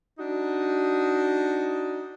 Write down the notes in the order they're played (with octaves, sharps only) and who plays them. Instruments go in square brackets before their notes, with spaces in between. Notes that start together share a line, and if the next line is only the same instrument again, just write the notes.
[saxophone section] D4 D#4 F#4